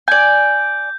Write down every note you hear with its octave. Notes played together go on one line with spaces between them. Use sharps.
D5 G#5 G6